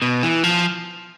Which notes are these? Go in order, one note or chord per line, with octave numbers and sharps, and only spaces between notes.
B2
E3
F3